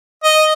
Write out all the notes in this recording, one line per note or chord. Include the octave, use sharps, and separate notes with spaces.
D#5